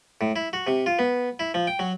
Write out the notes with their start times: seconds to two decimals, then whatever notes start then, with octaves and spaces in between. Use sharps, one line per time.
0.21 A2
0.36 E4
0.53 F#4
0.67 C3
0.86 F4
0.99 B3
1.39 E4
1.54 F3
1.67 G5
1.79 F#3